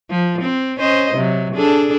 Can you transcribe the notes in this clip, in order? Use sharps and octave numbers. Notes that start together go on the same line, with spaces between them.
F3
C4
C#4 C5 D#5
C3 F#3
D4 G#4 A4